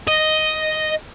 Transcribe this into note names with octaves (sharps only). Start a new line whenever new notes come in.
D#5